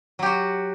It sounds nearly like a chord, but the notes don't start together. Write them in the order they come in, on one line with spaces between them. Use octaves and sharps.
F#3 G4 F#4